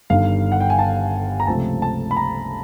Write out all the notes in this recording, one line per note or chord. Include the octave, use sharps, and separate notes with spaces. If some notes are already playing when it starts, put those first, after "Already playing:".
G1 G2 D#3 F5
F#5
G5
G#5
A5
A#5
C#2 C3 F3 A3 C4 A5
A5
B5
A#5